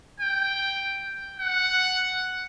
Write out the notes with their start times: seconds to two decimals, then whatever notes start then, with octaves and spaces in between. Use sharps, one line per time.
0.20 G5
1.40 F#5